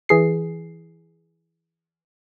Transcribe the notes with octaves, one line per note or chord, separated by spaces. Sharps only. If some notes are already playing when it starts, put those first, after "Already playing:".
E3 G#4 C7